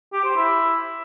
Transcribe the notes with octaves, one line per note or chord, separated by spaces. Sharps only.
G4
C5
E4